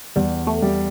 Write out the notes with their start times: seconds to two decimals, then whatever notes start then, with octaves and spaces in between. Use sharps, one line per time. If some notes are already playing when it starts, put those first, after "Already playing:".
0.16 E2 G3
0.47 A3
0.62 G3